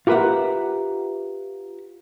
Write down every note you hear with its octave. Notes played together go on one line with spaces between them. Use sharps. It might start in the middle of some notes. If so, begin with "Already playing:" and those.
F4 G4 A#4 B4 E5 F#5